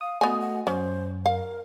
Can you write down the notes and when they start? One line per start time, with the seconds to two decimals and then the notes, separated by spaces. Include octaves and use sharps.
0.01 F5 D#6
0.21 A3 B3 F#4 D#5 G#5 D#6
0.41 F#5
0.67 F#2 C#4 C5
1.26 A#4 F5